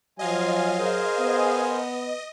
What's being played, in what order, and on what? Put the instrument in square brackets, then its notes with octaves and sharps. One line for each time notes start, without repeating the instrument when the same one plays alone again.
[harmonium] F3 F4 G#5 [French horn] F#3 [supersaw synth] D#5 F5
[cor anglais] G#4 [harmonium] A#4 C5 G#5
[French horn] B3
[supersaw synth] D#5